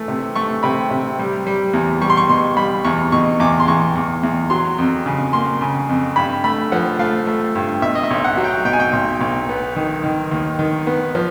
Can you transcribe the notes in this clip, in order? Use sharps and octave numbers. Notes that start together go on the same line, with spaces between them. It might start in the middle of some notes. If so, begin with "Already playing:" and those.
Already playing: E3 A3
C3
A3 C#6
C3 B5
C3
G3
G3
E2
G3 C#6
C6
C#6
B2 C6
G3 B5
E2 C#6
B2 C#6
E2 D6
C6
E2 C#6
E2
E2
F#3 C6
F2
C#3
A#3 C6
C#3
F2
G2 B5
A3 B5
F3 F#5
A3 F5
A3
G2
B2 E5
D#5
E5
B1
F#5
F#3
G5
B2 G5
G#5
G5
B1
B1
B3
D#3
D#3
D#2
D#3
B3
F3